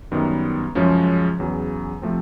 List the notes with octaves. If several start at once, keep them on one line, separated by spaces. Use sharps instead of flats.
F#2 D#3 G3 B3
F#2 C#3 F3 G#3 C#4
E2 C#3 F#3
C3 F3 A3 C4